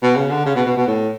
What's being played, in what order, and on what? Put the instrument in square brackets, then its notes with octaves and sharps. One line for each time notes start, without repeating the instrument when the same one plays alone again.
[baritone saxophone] B2
C#3
D3
C#3
B2
B2
B2
A2